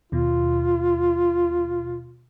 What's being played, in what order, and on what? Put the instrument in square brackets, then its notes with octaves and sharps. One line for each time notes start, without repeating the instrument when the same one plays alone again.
[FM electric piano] D#2 B2 [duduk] F4